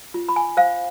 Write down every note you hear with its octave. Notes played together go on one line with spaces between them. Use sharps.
F4
B5
G#5
C5 F5